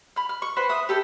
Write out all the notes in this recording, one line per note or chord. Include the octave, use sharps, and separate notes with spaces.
B5 F6
F6
C#6
B4 C5 F#5 B5
E5 D#6
G4 A4 B5